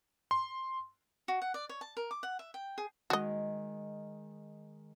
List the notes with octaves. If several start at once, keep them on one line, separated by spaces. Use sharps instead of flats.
C6
F#4
F#5
D5
C#5
A5
A#4
D6
F#5
E5
G5
G#4
D#3 G#3 F#4 D#5